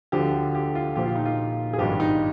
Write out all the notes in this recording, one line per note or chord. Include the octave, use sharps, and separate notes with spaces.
D2 D3 F3 G4
G4
F4
A#1 A#2 F3 G4
F4
D#4
F4
G#4
G#1 G2 F3 G4
D#4